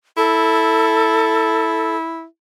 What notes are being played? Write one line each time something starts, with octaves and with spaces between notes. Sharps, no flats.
E4 A4